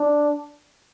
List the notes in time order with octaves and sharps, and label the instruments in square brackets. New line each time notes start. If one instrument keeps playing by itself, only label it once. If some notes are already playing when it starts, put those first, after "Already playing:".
Already playing: [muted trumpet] D4